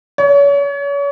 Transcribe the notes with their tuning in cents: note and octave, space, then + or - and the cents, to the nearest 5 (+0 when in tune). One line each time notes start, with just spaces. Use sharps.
C#5 +35